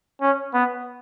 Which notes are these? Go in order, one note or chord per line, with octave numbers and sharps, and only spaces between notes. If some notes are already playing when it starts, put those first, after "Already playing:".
C#4
B3